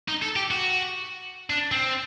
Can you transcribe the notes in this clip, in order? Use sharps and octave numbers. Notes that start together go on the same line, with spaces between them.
D#4
A4
G4
F#4
D4
C4